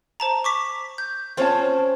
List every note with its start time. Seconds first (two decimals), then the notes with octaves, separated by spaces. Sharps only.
0.20 C5 A5 A#5
0.44 C#6 D6 B6
0.98 G6
1.37 C4 C#4 F4 C#5 A5